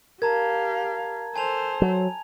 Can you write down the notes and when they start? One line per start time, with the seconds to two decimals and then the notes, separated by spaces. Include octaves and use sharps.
0.22 G4 A#4 F5 A5 A#5 G#6
1.36 A4 C5 G#5 A5 F7
1.82 F#3